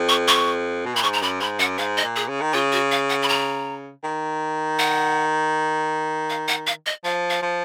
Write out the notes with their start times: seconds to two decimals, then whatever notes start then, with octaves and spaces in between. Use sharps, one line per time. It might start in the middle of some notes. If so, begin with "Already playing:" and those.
Already playing: F2
0.09 C#6
0.28 C#6
0.86 B2
0.95 A#2 B5
1.03 G#2 C#6
1.13 A#5
1.22 F#2 B5
1.41 G#2 B5
1.59 F#2 F#5
1.78 G#2 F5
1.97 D#5
2.04 A#2
2.16 G#4
2.29 C#3
2.41 D#3
2.53 C#3 F4
2.72 F#4
2.92 F5
3.10 F#5
3.22 B5
3.29 A#5
4.04 D#3
4.79 F#5
6.30 F5
6.48 F#5
6.67 F5
6.86 D#5
7.05 F3 F5
7.30 F5
7.42 F3